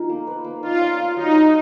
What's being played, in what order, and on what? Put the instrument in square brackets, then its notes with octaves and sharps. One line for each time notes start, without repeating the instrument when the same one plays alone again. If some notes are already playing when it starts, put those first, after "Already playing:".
Already playing: [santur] F3 D#4 G#4 A#4
A#3
B4
A#3
[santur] D#4 [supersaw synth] F4
[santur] D5
F5
[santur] F#3 [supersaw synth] D#4
[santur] D#4